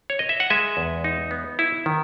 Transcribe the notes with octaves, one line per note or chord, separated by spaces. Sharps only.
C#5
D#5
E5
F#5
G#3 E5 G#5
E2
D#4
B3
E4
D#3